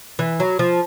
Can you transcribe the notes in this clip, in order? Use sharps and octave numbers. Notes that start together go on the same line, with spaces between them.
E3
F#3
F3